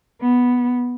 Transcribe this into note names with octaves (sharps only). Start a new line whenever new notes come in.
B3